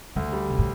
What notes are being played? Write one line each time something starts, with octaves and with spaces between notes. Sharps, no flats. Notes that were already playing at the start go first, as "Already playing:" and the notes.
D2 D3
G3
C3
A2